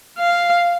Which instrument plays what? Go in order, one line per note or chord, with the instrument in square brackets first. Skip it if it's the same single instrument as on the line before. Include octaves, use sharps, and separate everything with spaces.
[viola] F5